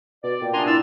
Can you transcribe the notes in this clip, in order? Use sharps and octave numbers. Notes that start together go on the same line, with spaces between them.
B2 D5
A#2 G5
C3 B3 D4 G#5 A#5 C6
E4 D5 E6